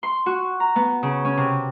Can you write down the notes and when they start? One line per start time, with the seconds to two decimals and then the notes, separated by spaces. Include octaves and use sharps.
0.03 C6
0.26 F#4
0.60 A#5
0.76 B3
1.03 C#3
1.25 C#4
1.37 C3